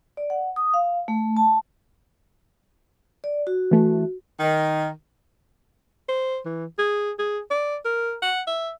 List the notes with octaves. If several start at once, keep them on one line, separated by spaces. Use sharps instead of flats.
D5
F#5
D#6
F5
A3
A5
D5
F#4
E3 A3
D#3
C5
E3
G#4
G#4
D5
A#4
F#5
E5